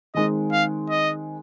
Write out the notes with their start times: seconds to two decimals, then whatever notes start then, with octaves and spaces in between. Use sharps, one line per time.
0.14 D#3 G#3 C4 D#4 D#5
0.52 F5
0.90 D#5